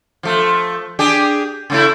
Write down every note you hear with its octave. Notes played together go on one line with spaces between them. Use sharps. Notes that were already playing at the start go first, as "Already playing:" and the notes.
F3 A3
D4 G4 G#4
C#3 A3 E4